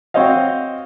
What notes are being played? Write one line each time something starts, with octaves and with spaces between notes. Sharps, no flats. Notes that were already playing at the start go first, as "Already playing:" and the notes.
C4 F#4 C5 C#5 D#5 F5